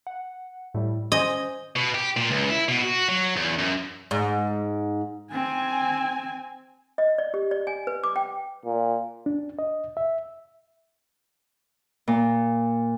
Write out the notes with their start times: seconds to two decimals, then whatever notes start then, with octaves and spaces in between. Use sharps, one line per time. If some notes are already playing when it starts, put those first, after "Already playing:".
0.07 F#5
0.74 A2 G3
1.12 C#4 C5 D#5 G#5
1.76 B2
1.95 G4
2.17 A#2
2.31 C#2
2.50 E4
2.68 B2
2.82 F#4
3.09 F#3
3.36 E2
3.59 F#2
4.11 G#2
5.33 C4 G#5
6.98 D#5
7.18 D5
7.34 G4
7.51 D5
7.67 G#5
7.87 B4
8.04 D6
8.16 G5
8.66 A#2
9.26 D4
9.59 D#5
9.97 E5
12.08 A#2